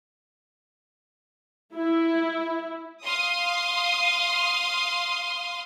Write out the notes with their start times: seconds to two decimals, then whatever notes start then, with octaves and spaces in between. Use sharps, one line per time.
1.74 E4
3.04 F5 C6 D#6